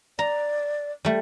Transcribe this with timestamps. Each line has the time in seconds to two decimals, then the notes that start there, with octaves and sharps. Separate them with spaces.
0.19 D5 A#5
1.05 G3 A3